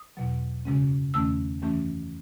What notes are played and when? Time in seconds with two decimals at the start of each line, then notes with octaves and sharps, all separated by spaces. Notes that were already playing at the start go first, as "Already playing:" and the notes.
Already playing: D#6
0.17 E2 B2 F#3
0.65 F#2 C#3 G#3 C#4
1.14 E2 D#3 A3 C#4 E6
1.62 F#2 E3 A3 C#4